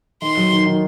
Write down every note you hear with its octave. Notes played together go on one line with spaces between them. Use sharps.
D#3 C6
F#3
D#3
D#3